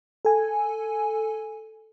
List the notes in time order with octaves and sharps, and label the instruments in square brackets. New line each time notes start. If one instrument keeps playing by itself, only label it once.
[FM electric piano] A4 G#5